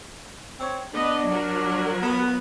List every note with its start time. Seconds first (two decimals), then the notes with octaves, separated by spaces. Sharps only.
0.59 C4 C#5
0.93 B3 D4 D#5
1.30 F#3 F#4 A#4
2.02 B3